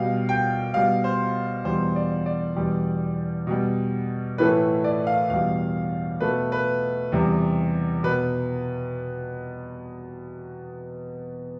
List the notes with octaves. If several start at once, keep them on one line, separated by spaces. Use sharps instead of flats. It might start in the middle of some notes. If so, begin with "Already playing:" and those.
Already playing: B2 G3 F5
G5
B2 G3 F5
C5
E2 B2 G3 C5
D5
D5
E2 B2 G3
B2 G3
A2 E3 A3 B4
D5
F5
E2 B2 G3 F5
B2 A3 B4
B4
E2 C3 G3
B2 B4